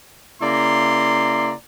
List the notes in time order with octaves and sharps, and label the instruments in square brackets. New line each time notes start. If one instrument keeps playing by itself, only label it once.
[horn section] C#3 A#3 E4 D5 A#5 C6